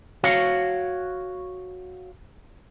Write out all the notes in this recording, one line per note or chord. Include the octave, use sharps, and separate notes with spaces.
F#4 C#5 F5